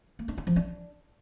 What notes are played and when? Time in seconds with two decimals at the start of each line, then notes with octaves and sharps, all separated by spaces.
0.19 A#3
0.28 D4
0.37 F4
0.47 F3
0.56 D4